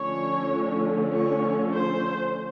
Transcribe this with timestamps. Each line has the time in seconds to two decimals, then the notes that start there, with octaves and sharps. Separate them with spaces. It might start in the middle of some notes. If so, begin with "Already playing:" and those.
Already playing: D3 F3 A3 C#4 C#5
1.10 C#5
1.72 C5